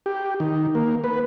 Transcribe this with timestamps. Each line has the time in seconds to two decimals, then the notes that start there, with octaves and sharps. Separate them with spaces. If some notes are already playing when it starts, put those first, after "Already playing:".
0.06 G4
0.40 D#3
0.75 A#3
1.04 B4